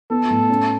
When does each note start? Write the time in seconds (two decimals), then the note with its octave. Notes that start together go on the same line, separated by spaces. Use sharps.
0.10 B3 A4
0.30 A2
0.49 C#4